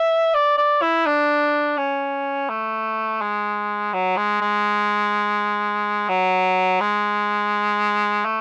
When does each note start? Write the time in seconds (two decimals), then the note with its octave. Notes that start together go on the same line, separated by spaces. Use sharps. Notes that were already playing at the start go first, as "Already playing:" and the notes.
Already playing: E5
0.34 D5
0.58 D5
0.82 E4
1.06 D4
1.77 C#4
2.49 A3
3.21 G#3
3.93 F#3
4.17 G#3
4.41 G#3
6.09 F#3
6.80 G#3
8.25 A3